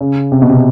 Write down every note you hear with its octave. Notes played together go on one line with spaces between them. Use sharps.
C#3
C3
B2
C3